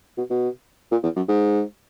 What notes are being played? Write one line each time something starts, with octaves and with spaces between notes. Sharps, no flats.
B2
B2
A#2
E2
F#2
G#2